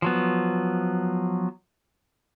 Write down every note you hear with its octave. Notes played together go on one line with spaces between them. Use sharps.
F3 F#3 B3